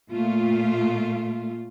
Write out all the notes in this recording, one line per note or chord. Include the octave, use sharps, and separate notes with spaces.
A#2 A3 F4